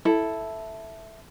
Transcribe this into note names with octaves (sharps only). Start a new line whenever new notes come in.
E4 A4